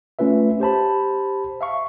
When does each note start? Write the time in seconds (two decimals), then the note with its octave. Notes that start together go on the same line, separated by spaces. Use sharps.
0.19 A3 C#4 F4 B4 E5
0.60 G4 C5 A5 B5
1.61 E5 F5 C#6